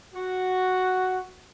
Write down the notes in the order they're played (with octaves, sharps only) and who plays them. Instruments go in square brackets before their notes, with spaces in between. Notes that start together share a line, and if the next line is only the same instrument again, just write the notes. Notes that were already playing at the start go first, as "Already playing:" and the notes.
[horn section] F#4